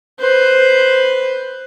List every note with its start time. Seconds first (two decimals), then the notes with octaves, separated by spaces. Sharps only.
0.19 B4 C5